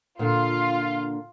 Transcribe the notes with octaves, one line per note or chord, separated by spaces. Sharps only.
A#2 D3 F4